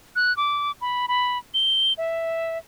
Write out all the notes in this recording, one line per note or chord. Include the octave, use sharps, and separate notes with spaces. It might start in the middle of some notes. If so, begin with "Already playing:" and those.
F#6
D6
B5
B5
G7
E5